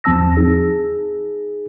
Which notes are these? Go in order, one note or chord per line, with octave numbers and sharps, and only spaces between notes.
E2 F3 C4 A5 E6 A#6
D#4 G#4